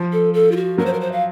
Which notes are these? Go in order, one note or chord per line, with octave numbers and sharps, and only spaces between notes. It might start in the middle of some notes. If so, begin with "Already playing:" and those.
Already playing: F3
A4
A4
F4
F#4
F#3 A#4
C5
A#4
C5
F5